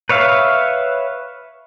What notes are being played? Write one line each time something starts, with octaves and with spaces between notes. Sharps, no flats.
B4 C#5 E5 F5